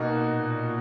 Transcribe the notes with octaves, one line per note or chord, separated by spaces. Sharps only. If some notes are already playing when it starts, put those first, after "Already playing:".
Already playing: B2 A#3 D#4 F#4
A#2